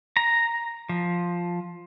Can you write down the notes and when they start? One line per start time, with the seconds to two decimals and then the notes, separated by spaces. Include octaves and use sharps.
0.17 A#5
0.89 F3